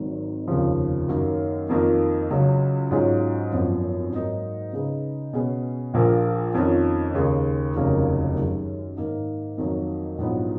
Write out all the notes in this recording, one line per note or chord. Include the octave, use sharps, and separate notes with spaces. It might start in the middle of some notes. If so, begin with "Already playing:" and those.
Already playing: G#1 G#2 D#3 F#3
F1 D#2 C#3 F3
F#2 D#3 F#3 A#3
F2 D#3 A#3 F4
C#2 C#3 F#3
G#2 F#3 C#4 F4 G#4
G#1 F#2 F3 B3
G#2 F#3 A#3 D#4
C#3 G#3 D#4 G#4 B4
B2 G#3 C#4 G#4 B4
A#1 A#2 F3 A#3
F2 D#3 A#3 C#4 F4
D#2 C#3 G#3
F1 D#2 C#3 F#3 A#3
F#2 D#3 G#3
G#2 D#3 A#3 D#4
F2 D#3 F#3 A#3
A#1 G#2 F#3 B3